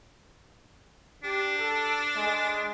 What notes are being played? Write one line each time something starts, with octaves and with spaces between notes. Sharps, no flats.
D4 G4
A4
G#3